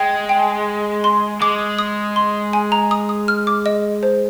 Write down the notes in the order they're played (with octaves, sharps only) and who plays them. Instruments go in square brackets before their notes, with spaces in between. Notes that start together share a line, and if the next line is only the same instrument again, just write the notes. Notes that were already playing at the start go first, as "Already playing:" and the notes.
Already playing: [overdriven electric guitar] G#3 [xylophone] G5
[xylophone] G5
C6
[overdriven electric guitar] G#3 [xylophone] D6
[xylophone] D#6
C6
G#5
A#5
D#6
D#6
F6
D6
D#5
C5